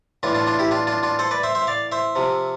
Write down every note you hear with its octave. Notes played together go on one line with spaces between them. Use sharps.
A2 E3 D4 F4
D4 F4
D4 F4
E4 G4
D4 F4
D4 F4
D4 F4
A4 C5
B4 D5
C5 E5
C5 E5
D5 F5
C5 E5
C3 F3